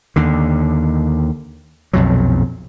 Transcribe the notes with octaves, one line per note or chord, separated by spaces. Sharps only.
D#2 D3
B1 F2 A#2 F#3